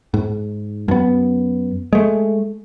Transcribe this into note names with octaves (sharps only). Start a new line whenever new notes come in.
G#2
F#2 B3
G#3 A3